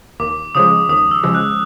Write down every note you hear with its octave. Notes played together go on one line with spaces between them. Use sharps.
D#2 D6
C#3 F3 G#3 D#6
D#2 D#6
E6
C#3 F3 G#3
F#6